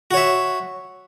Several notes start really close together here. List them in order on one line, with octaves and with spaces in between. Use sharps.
F#4 C#5 E5